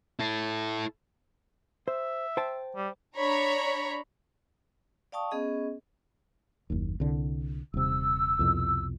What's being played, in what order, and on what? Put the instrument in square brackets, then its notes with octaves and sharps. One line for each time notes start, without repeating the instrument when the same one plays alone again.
[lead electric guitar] E4 A4
[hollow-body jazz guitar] C5 [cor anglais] E5
[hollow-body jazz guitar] C5 G5 A5
[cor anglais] G3
[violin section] D4 C#5 A#5 B5
[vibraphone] D5 F5 G5 A5 C#6 D#6
B3 C#4 G#4 D#5
[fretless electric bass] F#1 D#2
C2 D3
[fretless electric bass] D#1 C3 [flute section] E6
[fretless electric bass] C2 F2 B2